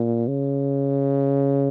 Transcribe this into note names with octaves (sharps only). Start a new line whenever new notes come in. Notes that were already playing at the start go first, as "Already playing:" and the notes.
Already playing: A#2
C#3